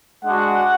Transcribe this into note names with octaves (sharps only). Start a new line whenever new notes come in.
G#3 D4 F#4 F#5